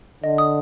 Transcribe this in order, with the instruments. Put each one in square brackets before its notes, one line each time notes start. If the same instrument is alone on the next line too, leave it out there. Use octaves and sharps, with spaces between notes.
[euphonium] D3 [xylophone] D#5
[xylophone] D#6